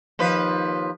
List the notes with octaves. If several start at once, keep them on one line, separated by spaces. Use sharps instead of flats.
D#2 F3 B4